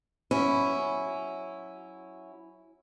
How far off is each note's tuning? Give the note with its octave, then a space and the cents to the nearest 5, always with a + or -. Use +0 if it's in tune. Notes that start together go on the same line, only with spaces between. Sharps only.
F#3 +0 C#4 +0 E4 +0